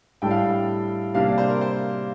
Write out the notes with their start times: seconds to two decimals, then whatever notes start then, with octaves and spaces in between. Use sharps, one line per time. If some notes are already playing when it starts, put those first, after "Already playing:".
0.22 A2 G3 D4 A4 G5
0.31 F5
0.38 G5
1.14 C3 G3 A#3 D4 G4 F5
1.26 D5
1.38 C5
1.49 A#4
1.61 C5